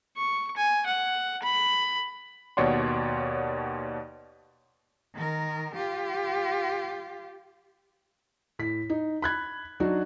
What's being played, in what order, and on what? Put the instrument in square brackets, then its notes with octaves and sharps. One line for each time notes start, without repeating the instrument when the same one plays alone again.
[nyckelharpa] C#6
G#5
F#5
B5
[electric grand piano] D#2 B2 C#5 D5 F#5 C6
[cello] D#3 A#4
F4 G4
[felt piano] A2 B6
D#4
B5 F#6 G#6
F#3 D4 D#4 F#4